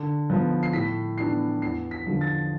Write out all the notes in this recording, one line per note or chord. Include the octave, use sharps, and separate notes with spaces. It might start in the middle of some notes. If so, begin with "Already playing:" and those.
Already playing: D3
F3 B3
C7
A2 B6
E3 B3 D4 C7
E2 C7
B6
D3 F3
A6